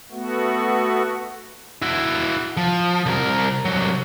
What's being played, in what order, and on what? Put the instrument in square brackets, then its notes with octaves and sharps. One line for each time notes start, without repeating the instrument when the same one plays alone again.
[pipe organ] A3 B3 F#4
[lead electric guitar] E4 F#4
F3
C2 A#4
C2 F#3